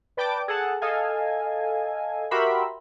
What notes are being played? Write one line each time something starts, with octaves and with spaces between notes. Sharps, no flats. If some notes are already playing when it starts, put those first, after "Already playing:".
B4 D5 G5 A5 D6
G#4 A4 F#5 A5
A4 D#5 F5 G#5
F#4 G4 A#4 E5 B5 C6